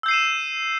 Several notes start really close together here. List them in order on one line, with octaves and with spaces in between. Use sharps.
E6 G6 C7 D#7 E7